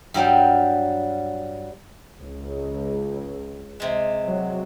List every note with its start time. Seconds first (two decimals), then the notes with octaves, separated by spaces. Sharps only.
0.14 G2 F#3 G3 G5
2.19 C#2
3.80 C3 G#3
4.26 F#3